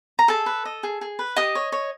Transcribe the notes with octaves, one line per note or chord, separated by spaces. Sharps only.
A#5
G#4 A4 A5
B4
D#5
G#4
G#4
B4
G4 D#5 D#6
C#5
C#5